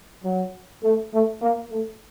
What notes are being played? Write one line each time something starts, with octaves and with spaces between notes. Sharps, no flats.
F#3
A3
A3
A#3
A3